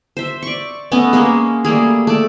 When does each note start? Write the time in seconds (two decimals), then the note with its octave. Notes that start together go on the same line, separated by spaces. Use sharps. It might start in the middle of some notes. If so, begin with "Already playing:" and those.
0.17 C5 E5
0.43 D5 C#6
0.92 A3 B3 C#4 D#5
1.13 G#3 A#3 C#4
1.65 G3 A3 A#3 G#4
2.07 A3 D5